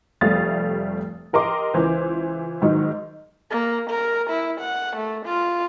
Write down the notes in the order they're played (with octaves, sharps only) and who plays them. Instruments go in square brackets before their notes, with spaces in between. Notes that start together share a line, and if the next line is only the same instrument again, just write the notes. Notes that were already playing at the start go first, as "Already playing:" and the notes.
[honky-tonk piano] F1 G3 A3 F5 D#6 A6
G4 A#4 D#5 C6 D6
C#2 E3 C5
G#2 D#3 F#3 D#4
[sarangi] A#3
A#4
E4
F#5
A3
F4